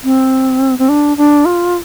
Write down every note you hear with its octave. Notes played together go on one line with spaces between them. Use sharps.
C4
C4
D4
D4
F4